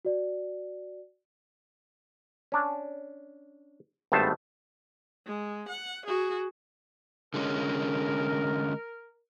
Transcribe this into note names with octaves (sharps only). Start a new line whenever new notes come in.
F#4 D5
C#4 D4
G#1 G2 A3 B3 C5 A5
G#3
F#5
F#4 G#4
D3 G#3 C#4 A#4